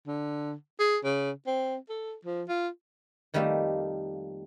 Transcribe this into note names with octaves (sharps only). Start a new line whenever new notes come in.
D3
G#4
C#3
C4
A4
F3
F4
F2 D#3 G3 A3 A#3